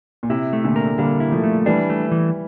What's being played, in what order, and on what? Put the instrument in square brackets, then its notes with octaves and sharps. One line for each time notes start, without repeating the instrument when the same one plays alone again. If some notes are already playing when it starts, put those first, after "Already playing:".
[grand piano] A#2
[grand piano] C3 [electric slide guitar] E4
[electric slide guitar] A3
[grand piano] A#2 D3
[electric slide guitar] A#4
[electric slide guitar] D3 [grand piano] G3 A#3
[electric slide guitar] E4
[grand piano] F3 A3
[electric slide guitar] A3
[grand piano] E3 G3 [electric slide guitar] D4
[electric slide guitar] A3
E3